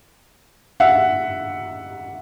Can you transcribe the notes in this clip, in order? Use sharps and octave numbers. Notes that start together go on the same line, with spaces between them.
E5 F#5